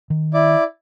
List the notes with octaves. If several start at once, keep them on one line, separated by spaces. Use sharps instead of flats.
D#3
E4 D5